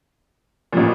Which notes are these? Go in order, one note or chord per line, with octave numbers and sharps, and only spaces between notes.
A1 A#2 F3